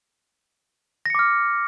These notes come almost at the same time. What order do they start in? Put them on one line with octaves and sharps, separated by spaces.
A#6 C#7 D6 F6